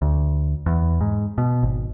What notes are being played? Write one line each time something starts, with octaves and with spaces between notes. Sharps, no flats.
D2
E2
G#2
B2
G#1